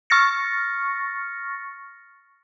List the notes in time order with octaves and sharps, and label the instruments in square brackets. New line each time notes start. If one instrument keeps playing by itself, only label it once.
[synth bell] C#6 F6 A6 A#6 C#7